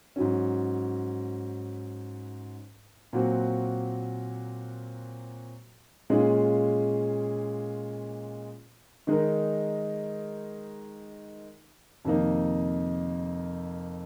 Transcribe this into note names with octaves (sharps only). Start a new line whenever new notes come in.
G#2 F#3 C#4
A#2 F#3 C4 F#4
A#2 G#3 C#4 F4 G#4
D#3 G#3 D#4 A#4
F2 C3 D#3 A#3 D#4